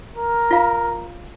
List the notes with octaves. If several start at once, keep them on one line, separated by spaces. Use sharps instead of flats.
A#4
F4 F5